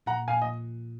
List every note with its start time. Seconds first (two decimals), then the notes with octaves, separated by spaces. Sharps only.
0.06 A#2 F#5 A#5
0.28 A#2 F5 G#5
0.42 D#5